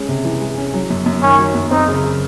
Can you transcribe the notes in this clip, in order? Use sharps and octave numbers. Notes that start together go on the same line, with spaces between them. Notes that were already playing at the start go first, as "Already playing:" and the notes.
Already playing: G#3 C#4
C3
E3
G#3
C#4
F#3
F#2
F#2
D#3 C#4
F#3
F#2
C4 D#4
C#3
C#3